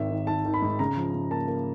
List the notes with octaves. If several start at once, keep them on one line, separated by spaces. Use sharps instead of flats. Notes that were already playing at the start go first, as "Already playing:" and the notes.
Already playing: G#1 D#3 E5
D#3
D#3 A5
D#3
B5
G#2
C#3 A#5
F3
C#3
A#3 A5
A#3